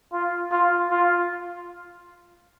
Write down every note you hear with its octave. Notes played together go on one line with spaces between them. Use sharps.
F4
F4
F4